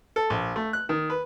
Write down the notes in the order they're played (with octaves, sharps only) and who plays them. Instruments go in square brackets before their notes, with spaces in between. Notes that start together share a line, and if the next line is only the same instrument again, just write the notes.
[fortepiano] A4
A#1
A3
F#6
D#3
B4